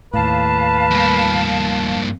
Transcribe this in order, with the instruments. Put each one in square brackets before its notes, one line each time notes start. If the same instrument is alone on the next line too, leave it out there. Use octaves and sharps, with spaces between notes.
[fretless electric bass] D#2 A2 [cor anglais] B4 [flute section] F5 A5
[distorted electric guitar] G2 A#3